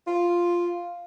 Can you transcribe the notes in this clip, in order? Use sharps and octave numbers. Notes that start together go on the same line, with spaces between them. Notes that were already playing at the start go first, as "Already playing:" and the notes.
F4